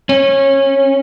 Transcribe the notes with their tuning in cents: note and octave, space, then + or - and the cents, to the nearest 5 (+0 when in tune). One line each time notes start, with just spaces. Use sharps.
C#4 -20